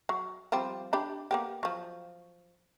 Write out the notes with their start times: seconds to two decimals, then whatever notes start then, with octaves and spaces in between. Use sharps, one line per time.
0.09 F#3
0.52 F3 G3 C4
0.93 D4 G4 B5
1.31 A#3 B3 G4
1.63 F3 F#3